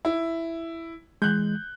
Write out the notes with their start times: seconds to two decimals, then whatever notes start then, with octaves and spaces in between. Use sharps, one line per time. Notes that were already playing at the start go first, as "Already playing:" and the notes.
0.05 E4
1.22 E3 G#3 F#6 G6